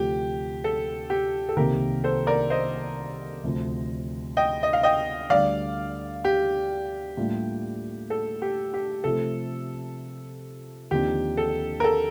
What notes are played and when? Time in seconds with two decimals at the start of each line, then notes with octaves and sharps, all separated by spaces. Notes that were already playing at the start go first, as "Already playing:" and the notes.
Already playing: D2 C3 F3 A3 G4
0.64 A4
1.10 G4
1.49 A4
1.57 C2 C3 D#3 A#3 G4 A#4
2.04 A4 C5
2.27 A#4 D5
2.50 C5 D#5
3.44 D2 C3 F3
4.37 D#5 G5
4.63 D#5
4.73 F5
4.83 D#5 G5
5.30 D2 D3 G3 D5 F5
6.24 G4
7.17 A2 G3 A#3 D4 F4
8.10 A4
8.42 G4
8.74 G4
9.04 C3 F3 A3 A4
10.91 D#2 D3 F3 C4 D#4 G4
11.37 A4
11.80 A#4
11.84 A4